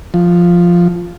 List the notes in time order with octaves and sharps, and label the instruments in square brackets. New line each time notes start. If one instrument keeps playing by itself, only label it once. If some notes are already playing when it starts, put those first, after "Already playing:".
[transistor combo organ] F3